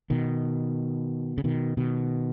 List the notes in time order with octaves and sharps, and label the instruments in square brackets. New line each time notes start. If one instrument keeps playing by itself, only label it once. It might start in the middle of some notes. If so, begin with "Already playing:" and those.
[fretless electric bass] B2 D#3
C#3
B2 D#3
B2 D#3